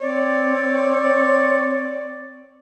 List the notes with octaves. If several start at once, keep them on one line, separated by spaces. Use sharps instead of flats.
C4 C#5 D5